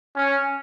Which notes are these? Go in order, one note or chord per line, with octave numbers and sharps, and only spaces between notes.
C#4